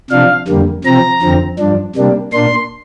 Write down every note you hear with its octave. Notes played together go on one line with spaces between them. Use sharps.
C3 F3 D4 F5
F2 D3 G3 A#3
C3 F3 C4 A#5
F2 D3 F3 C4
G2 F3 D4
C3 G3 A#3 D4
A#2 A#3 D4 C6